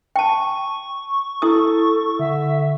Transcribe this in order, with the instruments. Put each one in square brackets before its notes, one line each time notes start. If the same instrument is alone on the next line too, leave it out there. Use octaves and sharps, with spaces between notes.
[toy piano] G5 A5 [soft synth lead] C#6
[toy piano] E4 D#6 [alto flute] A4
[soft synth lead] D3 [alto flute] E5